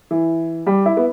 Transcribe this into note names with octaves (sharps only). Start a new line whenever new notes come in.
E3
G3
E4
B3